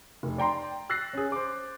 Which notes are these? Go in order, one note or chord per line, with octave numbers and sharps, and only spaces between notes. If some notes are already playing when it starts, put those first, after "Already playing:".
F1
D5 G5 A#5 C6
E6 F#6 A6 A#6 C7
C#4 G#4
C5 D6